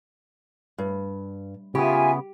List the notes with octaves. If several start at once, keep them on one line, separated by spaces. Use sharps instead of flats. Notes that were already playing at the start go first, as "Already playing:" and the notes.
G2
C#3 B3 F4 G4 E5 G#5